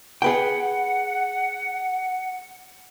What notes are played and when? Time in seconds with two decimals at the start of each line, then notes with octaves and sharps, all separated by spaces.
0.22 G#4 B4 F#5 G5